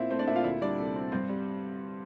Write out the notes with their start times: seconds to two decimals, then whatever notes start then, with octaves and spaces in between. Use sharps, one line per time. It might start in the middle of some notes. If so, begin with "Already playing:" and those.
Already playing: A#2 C4 E4 F4 E5
0.11 A3 C4 C5
0.19 D4 D5
0.27 A#2 E4 E5
0.36 F4 F5
0.44 D2 E4 E5
0.61 G3 D4 D5
0.78 C3 A4
0.96 C4
1.12 G2 C4 C5
1.29 G3